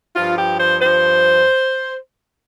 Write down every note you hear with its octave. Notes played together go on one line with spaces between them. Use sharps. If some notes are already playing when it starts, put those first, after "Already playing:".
G2 F3 F4
G4
C5
G2 F3 C5